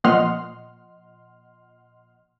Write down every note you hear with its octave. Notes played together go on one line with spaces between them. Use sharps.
A#2 F3 D#5 F#5 C6 F6